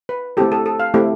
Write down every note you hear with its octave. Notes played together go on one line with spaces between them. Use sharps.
B4
A3 C4 E4 G4 A4
A4
A4
F5
A3 C4 E4 G4